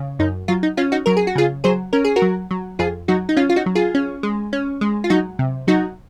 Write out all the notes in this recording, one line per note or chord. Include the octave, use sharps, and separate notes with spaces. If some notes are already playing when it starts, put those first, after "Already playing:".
Already playing: C#3
F#2 D#4
F#3 F4
D#4
C#4 F4
D#4 F#4
F#3 A#4
G#4
F#4
C#3 F4 G#4
F#3 G#4 C5
C#4 A#4
G#4
F#4 A#4
F#3
F#3
F2 F4 G#4
F#3 D#4 F#4
D#4
C#4 F4
F4
D#4 F#4
F#3
F4 G#4
C#4
G#3
C#4
G#3
F4
F#3 D#4 F#4
C3
F#3 D#4 F#4